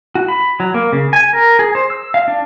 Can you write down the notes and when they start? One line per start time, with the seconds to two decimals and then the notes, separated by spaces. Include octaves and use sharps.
0.15 F#4
0.28 B5
0.60 F#3
0.74 A#3
0.93 C#3
1.13 G#5
1.33 A#4
1.59 G#4
1.75 C5
1.90 E6
2.14 F5
2.28 D4